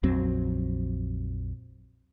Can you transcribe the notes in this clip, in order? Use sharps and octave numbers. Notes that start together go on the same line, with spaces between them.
A#1 F2 F#3 C4